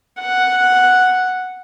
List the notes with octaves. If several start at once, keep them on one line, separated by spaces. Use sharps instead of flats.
F#5